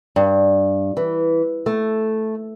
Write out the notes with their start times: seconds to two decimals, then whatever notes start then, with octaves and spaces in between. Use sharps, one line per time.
0.16 G2
0.97 E3
1.66 A3